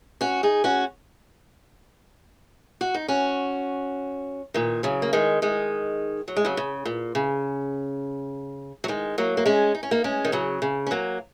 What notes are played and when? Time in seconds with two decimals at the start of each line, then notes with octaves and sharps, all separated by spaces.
0.21 C#4 F#4
0.43 D#4 G#4
0.64 C#4 F#4
2.81 F#4
2.94 D#4
3.08 C#4 F#4
4.54 A#2 D#3
4.83 C#3 F#3
5.02 A#3
5.13 D#3 G#3
5.42 D#3 G#3
6.28 F#3
6.36 G#3
6.45 C#3 F#3
6.57 C#3
6.85 A#2
7.15 C#3
8.84 F#3
8.88 D#3 G#3
9.18 F#3 A#3
9.37 A#3
9.46 G#3 C#4
9.75 D#4
9.83 C#4
9.91 A#3 D#4
10.04 G#3 C#4
10.25 D#3
10.32 C#3 F#3
10.62 C#3
10.86 C#4
10.91 F#3 A#3